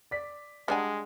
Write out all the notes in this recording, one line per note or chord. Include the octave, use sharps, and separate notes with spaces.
D5 B6
G3 G#3 D4 D5 F#5 G#5 A#5